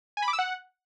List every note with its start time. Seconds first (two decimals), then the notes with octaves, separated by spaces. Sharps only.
0.17 G#5
0.22 B5
0.28 D6
0.33 E6
0.39 F#5